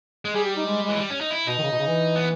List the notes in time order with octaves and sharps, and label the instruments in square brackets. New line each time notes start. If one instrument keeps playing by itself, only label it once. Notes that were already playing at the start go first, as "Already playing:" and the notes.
[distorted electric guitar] G#3
[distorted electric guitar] G3 [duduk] G#4
[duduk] G4
D#4
G#3
G#3
[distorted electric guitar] E3
G3
C#4
D#4
E4
[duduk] B2 [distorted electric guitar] D#4
[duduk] D#3
C#3
B2
C#3
E3
[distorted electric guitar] B3